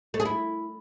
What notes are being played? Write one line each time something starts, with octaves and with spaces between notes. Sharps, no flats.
A3
G#4
E4